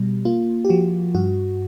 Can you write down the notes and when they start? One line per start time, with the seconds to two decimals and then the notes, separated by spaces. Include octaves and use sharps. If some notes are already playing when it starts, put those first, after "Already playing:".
Already playing: B2 G3
0.25 A#3 F4
0.65 G4
0.69 F3 F#4
1.15 G2 F#4